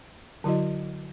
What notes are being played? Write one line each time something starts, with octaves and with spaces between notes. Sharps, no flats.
D3 F#3 E4 F#4 D#5